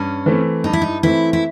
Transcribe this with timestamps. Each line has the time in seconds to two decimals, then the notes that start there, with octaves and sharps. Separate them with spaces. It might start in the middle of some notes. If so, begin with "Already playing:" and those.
Already playing: G2 C#4
0.26 E3 A3 C4
0.64 G2 D#4
0.73 E4
0.82 D#4
1.03 E3 A3 C4 E4
1.33 E4